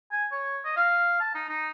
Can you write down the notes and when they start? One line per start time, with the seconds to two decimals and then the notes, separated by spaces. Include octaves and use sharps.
0.11 G#5
0.32 C#5
0.65 D#5
0.76 F5
1.20 A5
1.35 D#4
1.49 D#4